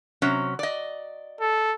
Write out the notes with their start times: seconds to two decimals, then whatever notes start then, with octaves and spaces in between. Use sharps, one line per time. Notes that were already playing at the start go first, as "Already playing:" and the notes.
0.22 C3 F#3 C#4
0.59 D5 D#5
1.41 A4